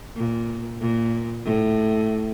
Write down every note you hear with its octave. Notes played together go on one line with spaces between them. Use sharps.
A#2
A#2
A2